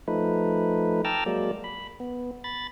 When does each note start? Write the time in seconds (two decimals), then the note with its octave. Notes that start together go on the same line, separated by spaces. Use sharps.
0.08 F3 A3 D#4 B4
1.05 G5 A5 A#5 D6 E6 F6
1.26 F#3 G#3 A#3 D5
1.64 B5
2.00 B3
2.44 B5 A6